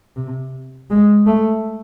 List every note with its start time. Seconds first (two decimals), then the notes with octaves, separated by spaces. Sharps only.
0.16 C3
0.90 G#3
1.27 A3